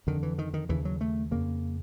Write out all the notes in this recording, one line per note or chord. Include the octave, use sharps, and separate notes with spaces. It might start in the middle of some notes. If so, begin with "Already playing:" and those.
F2 D3 D#3
E3
D#3
D#3
D#2 C#3 E3
F#3
A3
F2 C#3 A#3